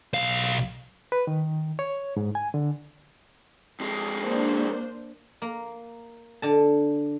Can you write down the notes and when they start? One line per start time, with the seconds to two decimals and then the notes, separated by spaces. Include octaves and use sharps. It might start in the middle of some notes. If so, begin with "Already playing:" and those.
0.14 B1 F5
1.12 B4
1.27 D#3
1.79 C#5
2.17 G#2
2.35 G#5
2.54 D3
3.80 F2 G#3
4.20 A#3 D4 C5
5.42 A#3
6.42 D3 A5